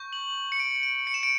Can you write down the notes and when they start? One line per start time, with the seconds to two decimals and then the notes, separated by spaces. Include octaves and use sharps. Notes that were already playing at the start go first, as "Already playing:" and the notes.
Already playing: C#6 G6
0.13 F#7
0.52 C#7
0.60 D7
0.83 D7
1.07 C#7
1.14 E7
1.23 D7